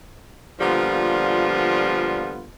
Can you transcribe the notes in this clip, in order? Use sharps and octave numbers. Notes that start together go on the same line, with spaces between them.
A#2 D3 F3 G3 B3 F4